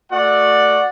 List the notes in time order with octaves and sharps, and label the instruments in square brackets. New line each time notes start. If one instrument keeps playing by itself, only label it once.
[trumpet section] A3 F#4 D5 F#5